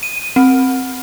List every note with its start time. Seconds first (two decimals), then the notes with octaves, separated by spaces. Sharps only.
0.03 D#7
0.36 C4